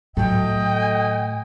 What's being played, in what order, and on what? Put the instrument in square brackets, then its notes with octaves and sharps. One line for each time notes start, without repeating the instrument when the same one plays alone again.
[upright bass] A2 D#3 [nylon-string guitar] F#3 A3 A4 [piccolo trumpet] D#5 [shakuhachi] G5